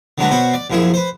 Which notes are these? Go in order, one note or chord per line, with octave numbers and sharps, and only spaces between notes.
D3 F#3 G#3 D4 F#4 B4
B2 F#4 C5 C#5 B5
D5
A#1 F#2 F3 E4 G#4
B4 C5